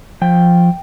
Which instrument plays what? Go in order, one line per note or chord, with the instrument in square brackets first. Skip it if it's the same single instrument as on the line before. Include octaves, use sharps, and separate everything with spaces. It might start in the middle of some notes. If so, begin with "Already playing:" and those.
[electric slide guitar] F3 G5